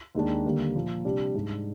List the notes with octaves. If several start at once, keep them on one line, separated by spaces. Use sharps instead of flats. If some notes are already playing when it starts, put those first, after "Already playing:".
D#2 D#3 G#3 D4
D#2 D3 G3 A#3
A#2 F3 A#3
C3 G3 D4
G#2 G3 D4